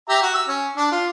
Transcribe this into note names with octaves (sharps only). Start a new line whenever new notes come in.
G4 E5 A#5
F#4
E6
C#4
D4
F4